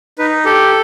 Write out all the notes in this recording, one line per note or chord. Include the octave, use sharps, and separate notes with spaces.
D#4 B4
G4 A4